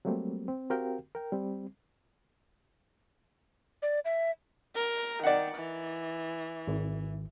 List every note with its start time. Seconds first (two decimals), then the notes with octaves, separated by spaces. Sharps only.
0.05 F#3 G3 A3 A#3 C4
0.48 C4
0.70 C4 F#4 G4 A#4 F5 G5
1.15 A#4 G5
1.32 G3 C4
3.82 D5
4.05 E5
4.76 A#4
5.23 D#3 D5 F#5
5.56 E3
6.68 G#1